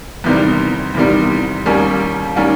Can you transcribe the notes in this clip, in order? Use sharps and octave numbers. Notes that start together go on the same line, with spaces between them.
E2 C3 D#3 G3
E2 C3 D#3 G3
D#2 D#3 G3 A#3 C#4
D#3 G3 A#3 C#4